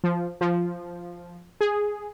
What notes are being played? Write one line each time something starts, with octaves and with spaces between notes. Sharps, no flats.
F3
F3
G#4